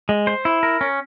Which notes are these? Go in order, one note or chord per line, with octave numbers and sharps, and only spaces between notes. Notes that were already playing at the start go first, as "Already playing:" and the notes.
G#3
C5
E4
A#4
C#4